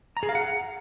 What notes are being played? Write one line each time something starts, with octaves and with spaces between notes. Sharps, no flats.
A#5
G#4
F5
F#5